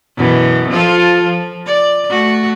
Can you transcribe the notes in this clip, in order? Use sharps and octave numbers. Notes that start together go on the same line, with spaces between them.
F#2 B2 E3
F3 F4 A4
F3
D5
A3 F#4